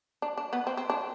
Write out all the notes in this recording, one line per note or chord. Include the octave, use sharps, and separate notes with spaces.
D4
D4
B3
C4
C4
D4